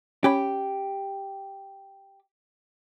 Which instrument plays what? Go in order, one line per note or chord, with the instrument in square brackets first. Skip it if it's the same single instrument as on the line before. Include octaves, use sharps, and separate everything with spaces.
[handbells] C#4 C#5 B5 [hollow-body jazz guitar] G4